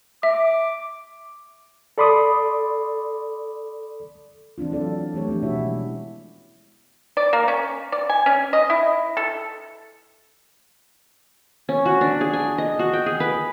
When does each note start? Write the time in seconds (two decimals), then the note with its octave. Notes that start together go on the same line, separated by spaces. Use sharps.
0.23 E5 D6
1.98 A4 D5 B5 C6 D6 D#6
4.58 E3 C4 D4 F4
4.72 F#3 D4 F4 A4 D5 F5
5.14 E3 A3 G4 C#5
5.28 F3 B3 C#4 D4
5.42 B2 E4 F#4 C#5 E5
5.65 G#3
7.17 D5
7.33 A#3
7.48 C#4
7.92 D5
8.09 G#5
8.26 C#4
8.53 D#5
8.70 E4
9.17 A4
11.69 C#4
11.86 F#4
12.01 D4
12.21 G#4
12.33 G#5
12.58 D#5
12.79 F#4
12.93 G5
13.06 G#4
13.20 B4